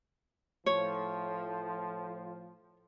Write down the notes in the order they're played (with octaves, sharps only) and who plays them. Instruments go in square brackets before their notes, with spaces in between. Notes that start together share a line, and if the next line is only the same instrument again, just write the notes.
[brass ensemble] A2 F3 [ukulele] C#5